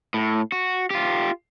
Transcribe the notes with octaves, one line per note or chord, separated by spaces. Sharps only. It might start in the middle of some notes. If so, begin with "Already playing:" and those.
A2
F#4
F4 G4